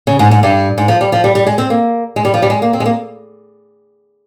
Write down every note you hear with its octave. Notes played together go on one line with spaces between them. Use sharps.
C#3
G#2
G#2
G2
G#2
F3
G3
F3
G3
G3
G#3
C4
A#3
G#3
G3
F3
G3
G#3
A#3
C4
G#3
A#3